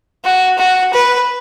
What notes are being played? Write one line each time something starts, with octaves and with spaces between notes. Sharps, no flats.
F#4
F#4
B4